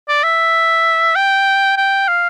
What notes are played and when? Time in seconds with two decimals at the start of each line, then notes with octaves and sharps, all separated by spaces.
0.09 D5
0.24 E5
1.15 G5
1.77 G5
2.08 F5